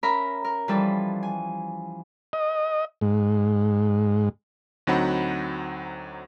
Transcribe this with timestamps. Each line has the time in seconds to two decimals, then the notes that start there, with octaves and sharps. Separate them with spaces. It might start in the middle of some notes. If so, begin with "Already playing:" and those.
0.03 C#4 A#4 E5 A#5 B5
0.44 A#4
0.68 E3 F3 G3 A4
1.23 G#5
2.33 D#5
3.01 G#2
4.87 D2 F#3 C4 D#4 F#5 B5